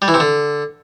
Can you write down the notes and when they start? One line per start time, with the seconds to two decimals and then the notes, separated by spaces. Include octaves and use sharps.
0.02 G3
0.08 E3
0.14 C3
0.20 D3